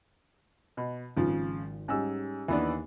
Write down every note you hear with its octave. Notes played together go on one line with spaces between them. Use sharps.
B2
G#1 C#3 F3
G#2 G3 C#4 E6
D#2 E3 B3 D4 D#4